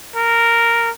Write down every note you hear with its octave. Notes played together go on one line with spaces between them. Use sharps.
A#4